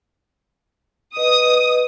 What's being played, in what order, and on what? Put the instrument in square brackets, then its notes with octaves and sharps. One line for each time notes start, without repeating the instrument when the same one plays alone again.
[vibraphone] B4 D#5 [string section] D#6